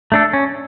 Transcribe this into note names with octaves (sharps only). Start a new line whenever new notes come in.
A3 D4 A4
C#4